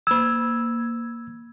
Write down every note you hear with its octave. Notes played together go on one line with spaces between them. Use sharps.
A#3 E6 G#6